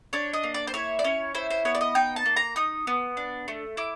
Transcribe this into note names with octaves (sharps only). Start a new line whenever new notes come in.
D4 C#5
D#5
A#3
D5
C5
E4 C#5
D5
C#4 C#5
E4 C5
C5
B3 C#5
D5
D#5
D#4 G5
A5
A#3
A#5
D#4 D#6
B3
D4
A3
E4 D6